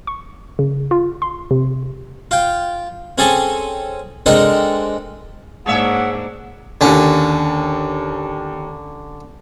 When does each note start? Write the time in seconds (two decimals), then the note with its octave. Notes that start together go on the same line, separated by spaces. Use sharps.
0.07 C#6
0.59 C#3
0.91 F4
1.22 C6
1.51 C3
2.31 F4 G5
3.18 C4 C#4 G#4 A4 G#5 A5
4.26 G#3 C4 D4 D#4 A4 A#4
5.66 G#2 A#3 D4 G#4 C#5 E5 F#5
6.81 D#2 D3 C#4 D4